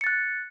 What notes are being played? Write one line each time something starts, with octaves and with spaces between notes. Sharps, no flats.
F#6 A6 C#7